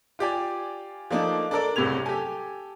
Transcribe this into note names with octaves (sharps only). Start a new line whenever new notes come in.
F4 G4 D5 G#5
F3 A3 A#3 D4 D#4
D4 A4 A#4 D5
F#1 C2 A2 C3 G#6 F7
G4 A4 G#5